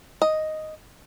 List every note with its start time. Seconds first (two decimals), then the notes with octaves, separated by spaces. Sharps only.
0.22 D#5